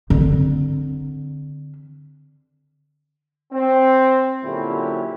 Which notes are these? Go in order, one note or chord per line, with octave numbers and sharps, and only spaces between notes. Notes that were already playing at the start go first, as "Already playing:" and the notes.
D3 C4
C4
A#2 D3 F#3 C#4 E4 G4